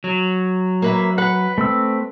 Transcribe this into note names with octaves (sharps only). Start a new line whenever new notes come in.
F#3
A#3 B4 E5
B4 F#5
A3 C4 E6